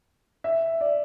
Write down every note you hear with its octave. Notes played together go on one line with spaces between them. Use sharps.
E5
D5